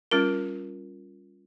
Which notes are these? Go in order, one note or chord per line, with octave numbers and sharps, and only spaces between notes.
G3 C#4 F4 A#4